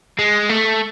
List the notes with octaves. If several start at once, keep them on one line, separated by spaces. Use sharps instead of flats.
G#3
A3